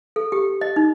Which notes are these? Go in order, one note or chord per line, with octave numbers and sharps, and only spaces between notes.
A4
G4
D#5
D#4